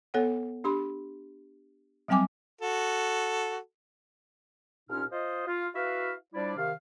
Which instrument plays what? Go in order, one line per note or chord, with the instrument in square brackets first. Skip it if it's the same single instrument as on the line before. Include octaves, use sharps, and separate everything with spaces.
[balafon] B3 A4 C#5 F#5
D4 G4 B5 C6
F#3 G3 C4 G5 G#5 D6
[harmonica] F#4 A4
[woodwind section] C2 A#2 C#4 D#4 F6
F4 C5 D#5
F4
E4 F#4 B4 E5 F5
F3 G3 D4 E4 D5
C3 D#3 F5